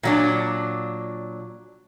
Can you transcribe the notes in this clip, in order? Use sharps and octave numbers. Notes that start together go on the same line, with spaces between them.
A#2 F#3 D4